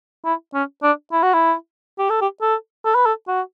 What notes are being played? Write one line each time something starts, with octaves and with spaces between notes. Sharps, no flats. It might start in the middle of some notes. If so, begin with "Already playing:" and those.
E4
C#4
D4
E4
F#4
E4
G4
A4
G4
A4
A4
B4
A4
F#4